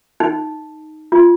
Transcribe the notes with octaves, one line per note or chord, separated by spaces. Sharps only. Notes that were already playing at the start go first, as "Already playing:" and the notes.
D#4
F4